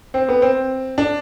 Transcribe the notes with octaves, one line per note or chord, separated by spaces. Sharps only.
C4
B3
C4
D4